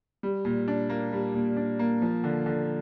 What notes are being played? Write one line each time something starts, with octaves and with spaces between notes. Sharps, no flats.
G3
A#2
D4
A#3
G3
A#2
D4
A#3
F3
D3
D3